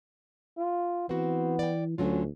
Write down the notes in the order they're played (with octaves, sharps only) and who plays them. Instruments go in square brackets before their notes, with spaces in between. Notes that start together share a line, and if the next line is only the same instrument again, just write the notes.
[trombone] F4
[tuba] E3 [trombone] B3 [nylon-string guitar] C4 F#4
[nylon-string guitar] D5 G5
[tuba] D2 [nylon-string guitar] D3 F#3 F4 [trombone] C#4